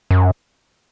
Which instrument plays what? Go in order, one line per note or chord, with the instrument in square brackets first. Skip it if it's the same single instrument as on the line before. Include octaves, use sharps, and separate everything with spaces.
[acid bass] F#2